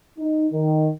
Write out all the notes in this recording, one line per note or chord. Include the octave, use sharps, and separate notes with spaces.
D#4
D#3